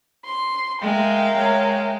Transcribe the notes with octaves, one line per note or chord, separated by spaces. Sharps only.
C6
G#3 A#4 E5 F5 G5
G#3 C#5